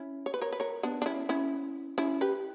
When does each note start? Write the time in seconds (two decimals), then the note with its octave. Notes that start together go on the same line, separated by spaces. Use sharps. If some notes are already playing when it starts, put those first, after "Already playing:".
Already playing: C#4 E4
0.26 C#5
0.34 B4
0.42 A#4 C#5
0.53 B4
0.60 A#4 C#5
0.83 B3 D4
1.02 D4
1.06 C#4 E4
1.29 C#4 E4
1.98 C#4 E4
2.21 G4 B4